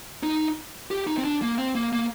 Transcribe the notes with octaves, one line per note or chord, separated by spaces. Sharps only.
D#4
G4
D#4
C4
D4
A#3
C4
A#3
A#3